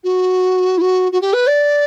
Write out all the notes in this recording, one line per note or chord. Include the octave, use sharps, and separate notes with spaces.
F#4
E4
F#4
F#4
G4
B4
D5